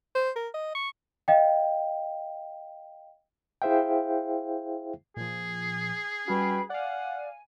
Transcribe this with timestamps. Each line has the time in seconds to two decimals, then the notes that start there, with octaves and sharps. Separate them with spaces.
0.15 C5
0.36 A#4
0.54 D#5
0.75 C#6
1.28 D#5 F5 G5
3.62 E4 G#4 C5 E5 F5 G5
5.17 A#2 F3 G#4
6.28 G3 C#4 F#4 B4 G5 B5
6.70 D5 F5 F#5 G#5